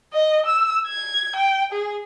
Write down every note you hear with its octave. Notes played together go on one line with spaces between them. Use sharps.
D#5
E6
G#6
G5
G#4